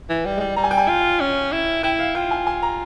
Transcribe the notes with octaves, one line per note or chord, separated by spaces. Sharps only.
E3
G3
G#3
G3
G3 A#5
G#5
G5
G#5
F4
C#4
E4
E4 G5
F5
F4 G5
G#5
G#5
A#5